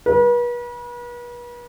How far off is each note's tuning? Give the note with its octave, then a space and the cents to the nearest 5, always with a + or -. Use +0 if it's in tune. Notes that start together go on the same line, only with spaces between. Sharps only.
B4 -40